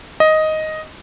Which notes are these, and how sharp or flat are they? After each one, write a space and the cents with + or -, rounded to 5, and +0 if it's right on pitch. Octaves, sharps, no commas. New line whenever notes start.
D#5 +5